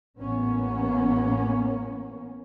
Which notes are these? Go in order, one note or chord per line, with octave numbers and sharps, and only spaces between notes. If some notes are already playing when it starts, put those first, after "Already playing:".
A1 A#3 B3 C#4